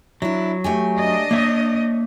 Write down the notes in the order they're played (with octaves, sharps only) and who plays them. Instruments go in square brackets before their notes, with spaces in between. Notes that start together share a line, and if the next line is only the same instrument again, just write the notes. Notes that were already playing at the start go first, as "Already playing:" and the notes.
[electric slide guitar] F#3 [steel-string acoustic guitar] D4 E4
[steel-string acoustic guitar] A3 G4 G#5
[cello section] D4 D#5
[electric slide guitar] A#3 E5 [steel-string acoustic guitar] C#5